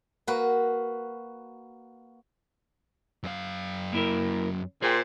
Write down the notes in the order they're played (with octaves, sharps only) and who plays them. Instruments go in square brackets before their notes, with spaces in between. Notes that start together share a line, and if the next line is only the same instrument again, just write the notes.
[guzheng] A#3 F#4 B4
[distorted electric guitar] F#2 F5
[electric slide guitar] A#3 E4 A#4
[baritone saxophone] A#2 [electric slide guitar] G#4 G5 [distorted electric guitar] C5